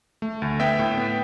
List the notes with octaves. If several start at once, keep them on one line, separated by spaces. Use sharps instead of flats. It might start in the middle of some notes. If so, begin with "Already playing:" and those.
A3
D2
B3 E5 G5
A2
B3